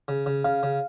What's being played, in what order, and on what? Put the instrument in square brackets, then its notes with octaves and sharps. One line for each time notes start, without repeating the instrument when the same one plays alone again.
[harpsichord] C#3
C#3
[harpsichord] C#3 [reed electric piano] F5
[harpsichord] C#3